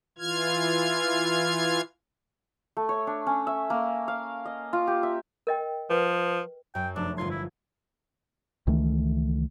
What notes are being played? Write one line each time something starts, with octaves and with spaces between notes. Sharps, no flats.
E3 F4 F6 G#6
A3
C#5
D4
C#4
E5
A#3
F5
D#5
F4
G4
E5
A#4 D#5 G5
F3 B4
F#2 G5
F1 A3 D4
G1 F4 C6 G#6
E4
C#2 D#3 E3 A3